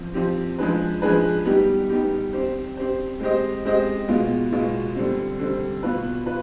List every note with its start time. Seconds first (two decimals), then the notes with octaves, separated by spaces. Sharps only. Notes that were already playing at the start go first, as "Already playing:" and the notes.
Already playing: F3 C4
0.14 F3 C4 G4
0.58 F3 G#3 D4 G#4 B4
1.02 F3 G#3 D4 G#4 B4
1.45 G3 B3 D#4 G4
1.89 G3 B3 D#4 G4
2.33 C4 G4 C5
2.77 C4 G4 C5
3.20 G#3 C4 G4 C5 D#5
3.65 G#3 C4 G4 C5 D#5
4.08 B2 G#3 B3 F4
4.52 B2 G#3 B3 F4
4.95 D3 G3 C4
5.39 D3 G3 C4
5.83 B2 B3 F4 B4
6.26 F4 B4